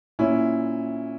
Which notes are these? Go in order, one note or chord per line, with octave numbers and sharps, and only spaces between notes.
A#2 C#4 E4